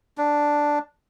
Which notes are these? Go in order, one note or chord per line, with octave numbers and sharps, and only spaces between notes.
D4